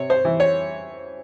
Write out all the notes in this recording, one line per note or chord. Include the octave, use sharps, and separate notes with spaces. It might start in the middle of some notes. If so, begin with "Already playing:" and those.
Already playing: C3 C#5
C5
E3
C#5